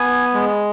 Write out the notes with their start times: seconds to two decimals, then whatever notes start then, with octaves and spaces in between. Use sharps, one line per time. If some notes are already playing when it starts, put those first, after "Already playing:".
Already playing: B3 G#5
0.34 G#3